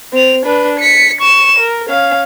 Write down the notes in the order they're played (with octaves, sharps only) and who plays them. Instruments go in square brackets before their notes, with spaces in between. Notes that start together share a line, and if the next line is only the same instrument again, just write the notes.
[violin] C4 F7
D4 B4
B6 C#7
C#6 E7
A#4
C#4 F5